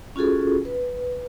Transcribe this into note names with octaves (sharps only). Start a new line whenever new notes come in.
C#4 F4 F#4 G#4 A4
B4